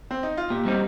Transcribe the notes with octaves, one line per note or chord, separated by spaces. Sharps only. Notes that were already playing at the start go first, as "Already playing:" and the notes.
C4
D#4
F4
A#2 G4
G3 C4 D#4